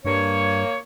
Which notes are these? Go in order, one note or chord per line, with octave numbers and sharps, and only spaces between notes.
G2 A#3 C#5